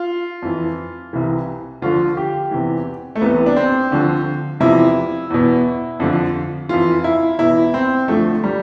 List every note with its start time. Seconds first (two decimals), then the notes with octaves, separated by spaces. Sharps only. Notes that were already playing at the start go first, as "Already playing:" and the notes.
Already playing: F4
0.42 F2 E3
1.13 C2 C3 E3
1.82 D2 D3 F3 F4
2.17 G4
2.51 E2 C3 E3
3.15 A3
3.21 C2 C3 E3 B3
3.46 D4
3.56 C4
3.91 D2 D3 F3
4.60 E2 C3 F3 E4
5.30 E2 B2
6.00 F2 D3 F3
6.69 F2 E3 F4
7.04 E4
7.38 E2 B2 E4
7.74 C4
8.08 D2 D3 F3 A3
8.44 G3